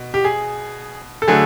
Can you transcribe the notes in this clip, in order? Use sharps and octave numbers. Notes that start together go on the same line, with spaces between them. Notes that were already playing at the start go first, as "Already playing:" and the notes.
Already playing: B2
G4
G#4
A4
D3 F#3 A3 G#4